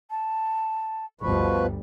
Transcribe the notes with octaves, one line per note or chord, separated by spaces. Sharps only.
A5
G1 D2 B2 F3 G3 B4 C#6